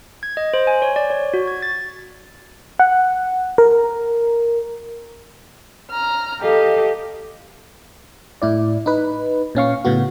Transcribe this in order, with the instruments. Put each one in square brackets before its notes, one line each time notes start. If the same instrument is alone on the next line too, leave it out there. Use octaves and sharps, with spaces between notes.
[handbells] G#6
D#5
C5
G#5
C#5
D5
C#5
F#4
G#6
A6
[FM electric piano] F#5
A#4
[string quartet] A#5 F6
G4 A4 D#5 F5
[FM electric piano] A2 E4 D5
D#4 B4
A#2 C#4 F5 C#6
A2 C#3 B3 F#4